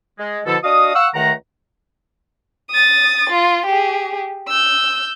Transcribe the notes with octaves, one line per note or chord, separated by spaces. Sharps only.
G#3
B2 D3 F3 E4 A4
D4 F#4 D#5 F5 D#6
F5 F#5 C#6 E6
C#2 D#3 A3 F#5 A#5
D#6 A6
F4
G4 G#4
E6 G6